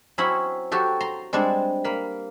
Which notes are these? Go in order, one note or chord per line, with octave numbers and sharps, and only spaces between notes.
F#3 C4 C#4 E4 C#5 B5
F#3 F#4 G4 A4
A#5 C6
G3 G#3 C4 D4
A#3 B5